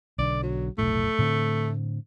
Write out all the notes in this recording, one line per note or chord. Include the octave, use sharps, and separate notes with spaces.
B1 D3 D5
F#3
F1 B1 A2 A3
A2 D3 C4